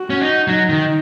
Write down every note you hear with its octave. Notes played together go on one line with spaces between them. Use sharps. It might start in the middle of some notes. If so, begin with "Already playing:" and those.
Already playing: F#4
C#4
D#4
F#3 D#4
D#3